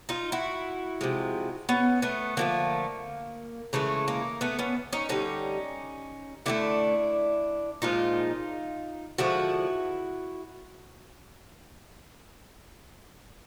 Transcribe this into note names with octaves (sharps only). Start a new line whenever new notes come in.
D#4 F4
E4 F#4
C3 F3 G#3
B3 C#4
A3 B3
D3 F3 A3 A#3
C#3 E3 G#3 A3
A#3
A3 B3
B3 C#4
C#4 D#4
D3 G3 C#4 D#4
D3 F#3 A3 D4 E4
A#2 F3 G#3 D#4 F4
D3 F3 G#3 E4 F#4